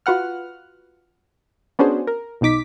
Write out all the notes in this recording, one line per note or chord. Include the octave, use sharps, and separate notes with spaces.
F4 F#4 B4 F#5 F6
B3 C#4 D4 F#4 G#4 C5
A#4
B1 B2 D#4 D6 B6